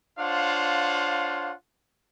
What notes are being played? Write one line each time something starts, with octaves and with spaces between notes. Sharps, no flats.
D4 F4 C5 C#5 F5 F#5